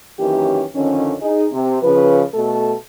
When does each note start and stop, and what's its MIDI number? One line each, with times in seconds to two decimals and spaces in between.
0.20 0.64 42
0.20 0.64 51
0.20 0.64 52
0.20 0.64 58
0.20 0.64 61
0.20 0.64 67
0.75 1.14 41
0.75 1.14 50
0.75 1.14 51
0.75 1.14 61
1.20 1.45 63
1.20 1.45 68
1.52 1.79 48
1.82 2.23 49
1.82 2.23 53
1.82 2.23 71
2.33 2.74 47
2.33 2.74 57
2.33 2.74 69